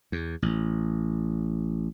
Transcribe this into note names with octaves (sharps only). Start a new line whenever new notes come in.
E2
A1